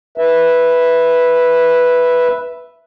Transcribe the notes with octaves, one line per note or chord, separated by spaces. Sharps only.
B4 E5